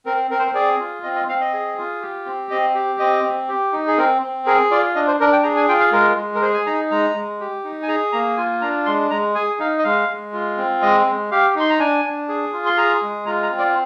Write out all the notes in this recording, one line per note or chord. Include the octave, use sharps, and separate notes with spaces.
C4 A#4
C4 A#4
C5
A#4
G#4 D5
F4
C4 D#5
D#5
C4 F5
D#5
G#4
F4
G4
C4
C4 D#5
G4
C4 D#5
C4
G4
D#4
G#4
C4 A#4
C4
G#4 A#4
F4 D5
D4 D#5
C5
D4 A#4
G5
G#4 A#5
G#5
F4 G5
F5
G#3 A#4
G#3
A#4
G#4 C5
G#5
D#4 A#5
G#3 A#5
G#3
G4
D#4
G#5
G#4 A#5
A#3 A#5
F4 G#5
D4 A#5
G#3 C6
G#3 A#5
G#4 G#5
D#4 F5
D#5
G#3 F5
G#3
F4
C4
G#3 D#5
G#3
G4 F5
D#4 C6
A#5
D4 G#5
D4
G#4
F4
C6
G#4 A#5
G#3
F4 A#5
A#5
C4
D5